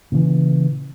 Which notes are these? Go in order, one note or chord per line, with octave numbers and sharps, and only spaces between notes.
A#2 C#3 E3